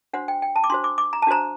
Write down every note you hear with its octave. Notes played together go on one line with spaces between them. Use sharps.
D4 F#4 C5 F#5
G5
G5
A5
D6
D4 F#4 C5 C6
D6
D6
A#5
A5
D4 F#4 C5 A#5